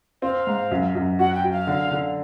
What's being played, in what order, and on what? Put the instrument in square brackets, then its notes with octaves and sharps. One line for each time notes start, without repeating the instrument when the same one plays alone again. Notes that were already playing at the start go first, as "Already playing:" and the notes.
[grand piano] C4 [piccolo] F5
[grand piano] G#2
F#2
F#2
[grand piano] F#4 [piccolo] F#5
[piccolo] G5
[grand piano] F#3
[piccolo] F5
[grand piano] D3
D3